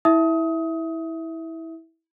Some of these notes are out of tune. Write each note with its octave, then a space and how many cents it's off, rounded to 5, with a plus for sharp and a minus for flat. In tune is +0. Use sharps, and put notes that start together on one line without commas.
E4 -20 E5 +0 D#6 +25